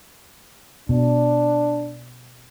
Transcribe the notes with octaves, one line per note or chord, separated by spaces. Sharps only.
B2 D4